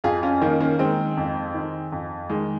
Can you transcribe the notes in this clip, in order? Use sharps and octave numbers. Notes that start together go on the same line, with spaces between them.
F2 F4 G#4
C#4 F4
D#3 A#3 C#4
A#3 C#4
D#3 G#3 C4
F2
D#3
F2
D#3 G#3